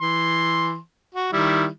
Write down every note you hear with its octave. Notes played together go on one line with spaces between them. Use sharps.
E3 C6
F#4
D#3 G3 E4